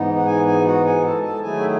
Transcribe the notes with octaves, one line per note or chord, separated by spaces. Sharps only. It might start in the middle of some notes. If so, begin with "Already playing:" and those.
Already playing: G#2 E3 B3 D#4
F#5
G#4 G#5
G#4 G#5
F#4 F#5
G#4 G#5
A4 A5
A4 A5
D#3 F#3 A3 E4 G#4 G#5
E5